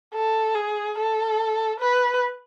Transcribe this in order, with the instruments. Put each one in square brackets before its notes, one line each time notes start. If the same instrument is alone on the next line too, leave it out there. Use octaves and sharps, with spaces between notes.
[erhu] A4
G#4
A4
B4